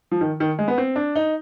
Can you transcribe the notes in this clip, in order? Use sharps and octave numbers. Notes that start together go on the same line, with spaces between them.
F3
D#3
D#3
G#3
B3
C4
D4
D#4